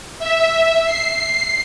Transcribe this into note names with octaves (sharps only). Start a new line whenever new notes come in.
E5
C7